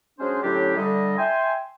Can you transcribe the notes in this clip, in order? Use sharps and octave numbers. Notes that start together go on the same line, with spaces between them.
F#3 G#3 C#4 D4 G#4 C5
A2 D3 F#3 C#4 D4 G4
D3 G3 D#5 E5
E5 G5 G#5 C6